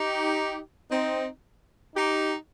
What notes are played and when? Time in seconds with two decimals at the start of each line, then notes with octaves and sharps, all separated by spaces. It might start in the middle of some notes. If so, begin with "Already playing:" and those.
Already playing: D#4 G4
0.90 C4 D#4
1.95 D#4 G4